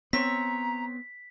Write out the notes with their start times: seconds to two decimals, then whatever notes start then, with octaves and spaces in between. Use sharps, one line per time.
0.13 B3 C4 C#5 A#5 B6